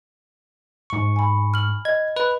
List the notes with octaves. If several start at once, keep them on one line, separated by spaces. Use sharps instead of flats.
G#2 C#6
G#5 B5
F6 F#7
D#5 G#6
B4